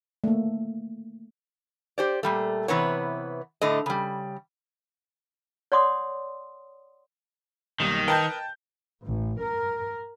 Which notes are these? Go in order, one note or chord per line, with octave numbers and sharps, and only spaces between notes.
A3 A#3
G4 C5 D5
A#2 G3 A3
C3 E3 B3 C#5
A2 D3 A3 D#5
C#3 G3
C#5 D5 F#5 C6 D6 D#6
B1 D#3 G3 A#3
A#4 B4 D#5 G5 A5 G6
A1
A#4